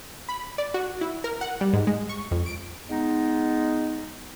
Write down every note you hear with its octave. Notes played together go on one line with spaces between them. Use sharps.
B5
D5
F#4
E4
A#4
F#5
G3
G#2
G#3
C#6
F2
D7
G#3 B3 D#4